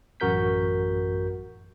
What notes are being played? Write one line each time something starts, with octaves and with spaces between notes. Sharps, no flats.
A1 F#2 F#4 A#4 G6 B6